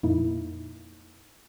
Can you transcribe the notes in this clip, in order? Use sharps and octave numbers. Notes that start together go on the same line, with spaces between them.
F2 A#2 A#3 D#4 E4